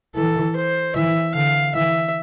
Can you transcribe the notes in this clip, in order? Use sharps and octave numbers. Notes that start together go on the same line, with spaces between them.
E3 A4
C5
E3 E5
D3 F5
E3 E5